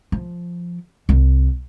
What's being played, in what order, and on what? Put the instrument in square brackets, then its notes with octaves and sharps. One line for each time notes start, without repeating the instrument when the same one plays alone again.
[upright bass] F3
C2